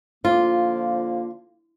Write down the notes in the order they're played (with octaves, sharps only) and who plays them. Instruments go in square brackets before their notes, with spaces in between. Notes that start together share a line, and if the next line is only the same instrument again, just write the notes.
[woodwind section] D3 F3 A#3 [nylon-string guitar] F4